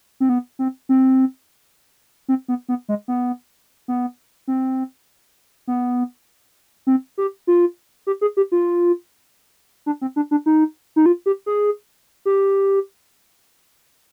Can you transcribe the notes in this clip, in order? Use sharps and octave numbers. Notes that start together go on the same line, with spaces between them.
C4
B3
C4
C4
C4
B3
B3
G#3
B3
B3
C4
B3
C4
G4
F4
G4
G#4
G4
F4
D4
C4
D4
D4
D#4
D#4
F4
G4
G#4
G4